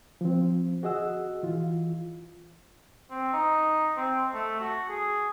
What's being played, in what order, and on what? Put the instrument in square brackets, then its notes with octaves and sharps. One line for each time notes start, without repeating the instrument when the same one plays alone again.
[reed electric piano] F3 C4
F#4 G#4 D#5 F#5 E6
E3 F4
[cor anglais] C4
D#4
C4
A3
F#4
G#4